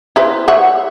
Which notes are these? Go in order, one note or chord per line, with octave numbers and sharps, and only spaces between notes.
E4 B4 C5
C#5 E5 F#5